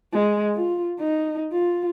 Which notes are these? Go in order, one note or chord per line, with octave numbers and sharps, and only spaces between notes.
G#3
F4
D#4
F4